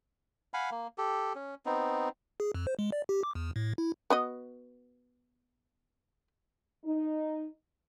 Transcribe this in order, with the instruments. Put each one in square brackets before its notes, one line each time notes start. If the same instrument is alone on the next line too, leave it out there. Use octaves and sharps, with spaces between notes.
[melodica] F5 F#5 G#5 B5
A#3
G4 A4
C#4
B3 C4 D#4
[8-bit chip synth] G#4
F2
C5
G#3
D5
G4
D6
E2
A2
E4
[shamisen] B3 F#4 D#5
[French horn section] D#4